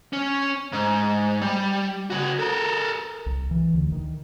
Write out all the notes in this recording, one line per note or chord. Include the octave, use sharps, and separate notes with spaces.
C#4
G#2
G3
C#3 F#4
A4 A#4
C2
E3
D2
D#3